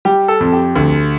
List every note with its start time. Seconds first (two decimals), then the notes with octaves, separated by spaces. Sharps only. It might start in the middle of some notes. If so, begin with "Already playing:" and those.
0.05 G3 G4
0.28 A4
0.41 F2
0.53 G4
0.75 D2